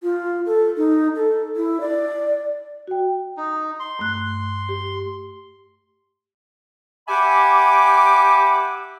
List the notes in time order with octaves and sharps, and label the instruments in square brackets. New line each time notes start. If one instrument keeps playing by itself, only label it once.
[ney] F4
A4
D#4
A4
E4
D5
[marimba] F#4 G5
[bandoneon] D#4
C6
[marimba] G2 A3 F#6
G4
[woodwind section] G4 E5 F#5 G#5 B5 D6